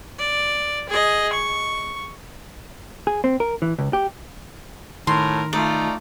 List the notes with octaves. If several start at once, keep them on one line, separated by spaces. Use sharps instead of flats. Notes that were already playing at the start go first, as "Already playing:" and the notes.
D5
G#4 D#5
C#6
G#4
C4
A#4
E3
C#2
G4
A2 D#3 A#4 C6
A3 D#4 F4 D5